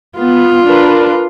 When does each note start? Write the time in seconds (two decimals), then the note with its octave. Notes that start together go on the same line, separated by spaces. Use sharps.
0.18 B3 F4
0.65 D4 A#4 B4